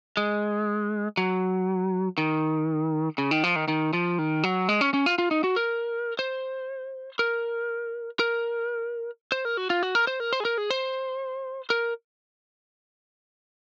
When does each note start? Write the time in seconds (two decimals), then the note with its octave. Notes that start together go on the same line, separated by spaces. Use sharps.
0.17 G#3
1.17 F#3
2.18 D#3
3.18 C#3
3.31 D#3
3.44 F3
3.56 D#3
3.68 D#3
3.93 F3
4.19 D#3
4.43 F#3
4.69 G#3
4.81 C#4
4.94 C#4
5.06 F4
5.18 F4
5.31 D#4
5.44 F#4
5.56 A#4
6.19 C5
7.19 A#4
8.20 A#4
9.32 C5
9.45 A#4
9.57 F#4
9.70 F4
9.83 F#4
9.95 A#4
10.07 C5
10.20 A#4
10.33 C5
10.40 G#4
10.45 A#4
10.58 G#4
10.70 C5
11.70 A#4